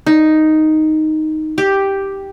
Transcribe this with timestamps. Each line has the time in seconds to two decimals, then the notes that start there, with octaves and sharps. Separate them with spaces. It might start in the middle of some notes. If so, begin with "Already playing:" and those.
0.07 D#4
1.58 G4